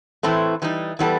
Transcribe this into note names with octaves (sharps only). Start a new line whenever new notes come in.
A2 E3 A3 C4 E4
E3 G3 D#4
E3 G3 B3 D#4 A4